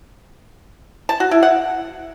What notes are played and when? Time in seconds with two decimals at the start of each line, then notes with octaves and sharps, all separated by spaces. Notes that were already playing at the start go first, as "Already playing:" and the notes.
1.09 A5
1.20 F#4
1.31 E4
1.43 F#5